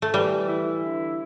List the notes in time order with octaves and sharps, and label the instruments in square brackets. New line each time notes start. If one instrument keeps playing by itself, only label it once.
[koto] A3
[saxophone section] E3 [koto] G3
[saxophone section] E4
D3